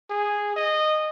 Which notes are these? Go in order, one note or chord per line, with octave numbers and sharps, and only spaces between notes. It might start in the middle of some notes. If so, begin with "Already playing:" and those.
G#4
D#5